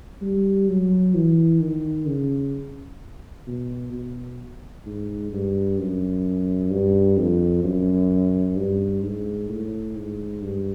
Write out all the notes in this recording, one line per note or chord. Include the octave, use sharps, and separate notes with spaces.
G3
F#3
E3
D#3
C#3
B2
B2
G#2
G2
F#2
G2
F2
F#2
G2
G#2
A2
G#2
G2